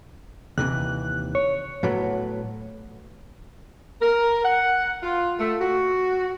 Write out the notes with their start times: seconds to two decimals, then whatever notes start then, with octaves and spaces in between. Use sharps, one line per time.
0.58 D#2 C3 E3 F#6
1.35 C#5
1.83 A2 F#3 B3
4.00 A#4
4.43 F#5
5.03 F4
5.39 A3
5.59 F#4